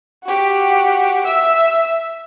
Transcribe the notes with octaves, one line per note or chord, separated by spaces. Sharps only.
F#4 G4
E5 E6